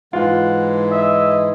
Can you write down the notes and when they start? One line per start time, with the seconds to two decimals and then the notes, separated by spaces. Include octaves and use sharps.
0.13 G#2 E3 G#3 F4 F#5
0.91 D#5 E5